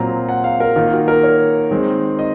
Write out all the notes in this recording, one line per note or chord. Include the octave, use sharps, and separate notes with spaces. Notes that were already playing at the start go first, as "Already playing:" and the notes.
Already playing: A#2 F#3 C4 A#5
F#5
F5
A#4
D#3 A#3 F4
F#4
A#4
C#5
D#3 G#3 C4
D#5